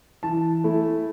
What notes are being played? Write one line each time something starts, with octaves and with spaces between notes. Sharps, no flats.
E3 A5
A3 E4